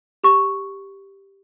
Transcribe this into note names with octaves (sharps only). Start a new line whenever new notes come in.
G4 C#6